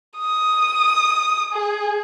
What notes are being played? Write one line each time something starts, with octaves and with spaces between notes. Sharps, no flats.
D#6
G#4